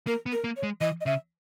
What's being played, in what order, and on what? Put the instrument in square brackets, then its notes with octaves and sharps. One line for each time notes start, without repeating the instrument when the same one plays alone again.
[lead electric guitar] A#3 [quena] A#4
[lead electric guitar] B3
[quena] A#4
[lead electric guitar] A#3
[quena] C#5
[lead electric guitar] G#3
[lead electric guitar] E3 [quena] D#5
[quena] D#5
[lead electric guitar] C#3 [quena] E5